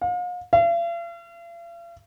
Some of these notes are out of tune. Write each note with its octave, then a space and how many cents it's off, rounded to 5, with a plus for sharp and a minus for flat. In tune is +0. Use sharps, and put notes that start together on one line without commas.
F5 +40
F5 -45